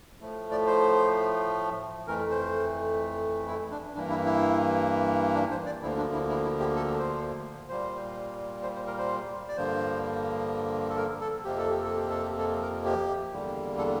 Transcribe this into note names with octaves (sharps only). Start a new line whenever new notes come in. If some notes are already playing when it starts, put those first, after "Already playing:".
A2 F3 A3
D5
C5
F2 E3 A3 A#4
C5
E4
D4
G2 E3 A#3 D4
E4
E4
D4
C5
D5
D2 D3 F3 A#3 E4
D4
E4
E4
E4
G4
A4
C5
A#2 G3 A#3 C5
C5
C5
A#4
C5
D5
G2 D3 F3 A#3 C5
A4
A#4
A4
F2 C3 F3 A#3 G4
A4
G4
A4
G4
A4
G4
A4
A#4
G4
E2 D3 G3 A#3
A4